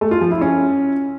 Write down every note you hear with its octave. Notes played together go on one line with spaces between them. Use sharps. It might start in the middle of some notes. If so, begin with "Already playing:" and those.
A3
F4
F3
E4
C#4